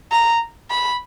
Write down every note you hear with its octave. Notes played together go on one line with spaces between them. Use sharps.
A#5
B5